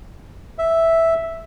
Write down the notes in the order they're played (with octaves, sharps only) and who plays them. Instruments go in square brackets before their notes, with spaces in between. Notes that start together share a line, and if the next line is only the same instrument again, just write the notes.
[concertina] E5